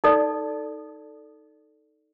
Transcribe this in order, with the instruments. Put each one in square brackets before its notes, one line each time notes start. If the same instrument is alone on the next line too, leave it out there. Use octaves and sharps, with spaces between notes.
[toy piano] D#4 A4 D5